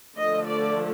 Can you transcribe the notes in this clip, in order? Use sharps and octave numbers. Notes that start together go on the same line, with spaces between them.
D3 F3 A3 D#5
D5